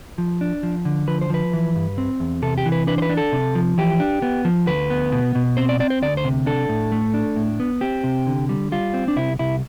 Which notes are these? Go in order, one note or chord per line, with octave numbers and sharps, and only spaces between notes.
F3
D4
F3
D3
F3 B4
C5
F3 B4
E3
G2
C4
E2
C3 A4
G4
E3
B4
D4 B4
C5
B4
D4
A4
C3
F3
E3 G4
D4
B3
F3
D2 B4
B3
B2
B2
C4 C5
D5
C4 D5
C5
D2 D5
C5
C3
D4 A4
A2
A3
D4
A2
B3
C4 G4
C3
D3
G3
G3 F4
C4
D4
C2 E4
C2 E4